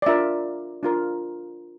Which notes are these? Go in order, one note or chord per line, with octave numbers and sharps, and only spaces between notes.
D5
D4 F4 A#4 E5
D4 F4 A#4